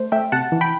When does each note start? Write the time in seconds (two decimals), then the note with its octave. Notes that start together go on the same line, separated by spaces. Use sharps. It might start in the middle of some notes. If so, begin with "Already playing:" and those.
Already playing: A3 C5
0.12 A3 E5 G5
0.32 C3 F#5 A5
0.52 E3
0.61 G5 B5